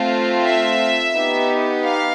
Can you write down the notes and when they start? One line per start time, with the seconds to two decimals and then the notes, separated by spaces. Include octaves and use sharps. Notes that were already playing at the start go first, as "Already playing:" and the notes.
Already playing: A3 C4 F4
0.45 E5
1.15 B3 D#4 G4
1.84 F5